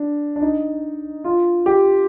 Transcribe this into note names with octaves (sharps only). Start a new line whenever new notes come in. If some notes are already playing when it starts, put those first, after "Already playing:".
Already playing: D4
D4
D#4
F4
G4